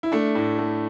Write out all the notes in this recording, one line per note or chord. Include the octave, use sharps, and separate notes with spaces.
E4
A3 D4
A2
A3